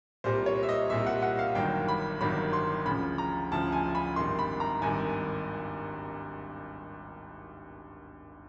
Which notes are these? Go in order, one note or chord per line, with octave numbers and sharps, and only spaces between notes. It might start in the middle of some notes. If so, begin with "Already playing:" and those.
C2 A#2 G3 C5
C#5
E5
D#5
C2 A#2 G3 E5
F#5
F#5
F5
G1 G2 D#3 F#3 G5
B5
G1 G2 D#3 F#3 B5
C6
D2 C#3 F3 B5
A#5
D2 C#3 F3 A5
G#5
B5
G#1 G2 D#3 C6
B5
A#5
G#1 G2 D#3 G#5